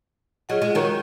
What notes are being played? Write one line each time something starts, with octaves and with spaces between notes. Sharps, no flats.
F#3 F4 G#4 D#5 F#5
G#3
D#3 F#3